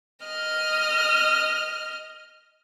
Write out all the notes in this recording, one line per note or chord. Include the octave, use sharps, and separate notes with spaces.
D#5 F6